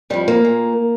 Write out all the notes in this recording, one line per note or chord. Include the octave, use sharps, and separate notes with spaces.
F2 F3 G3
A#3
A#2